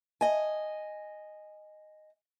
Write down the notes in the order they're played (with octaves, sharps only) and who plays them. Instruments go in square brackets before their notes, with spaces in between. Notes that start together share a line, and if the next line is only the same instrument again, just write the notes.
[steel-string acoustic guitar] D#5 G#5